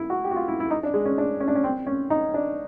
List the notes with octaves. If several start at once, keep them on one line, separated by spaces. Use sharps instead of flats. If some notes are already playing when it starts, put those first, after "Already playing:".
Already playing: E4
F#4
G4
F#4
F4
E4
E4
D#4
D4
G#3
C#4
D4
C#4
D4
C#4
C4
C#4
D#4
D4